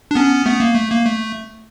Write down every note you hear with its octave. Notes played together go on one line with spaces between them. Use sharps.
D4
B3 C#4
A3 B3
A#3
A3
A#3
A3